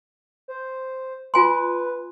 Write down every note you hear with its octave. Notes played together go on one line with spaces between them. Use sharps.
C5
F4 B4 G#5 C6